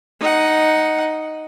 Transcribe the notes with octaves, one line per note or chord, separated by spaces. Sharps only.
D#4 F#5